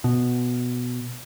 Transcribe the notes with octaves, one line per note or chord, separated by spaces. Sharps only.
B2